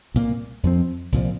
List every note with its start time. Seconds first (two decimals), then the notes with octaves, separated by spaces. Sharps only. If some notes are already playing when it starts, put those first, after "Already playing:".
0.14 C2 A#2 A#3
0.63 F2 F3 C4
1.12 C2 A#2 F3